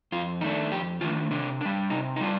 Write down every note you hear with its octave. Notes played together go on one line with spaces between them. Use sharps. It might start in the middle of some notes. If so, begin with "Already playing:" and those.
F2 F4
D#3 A3 D4 D#4
F2 G4
D#3 A3 D4 F4
C3 D4
G3 D4
C3 D#4
D#4
G3 D4 F4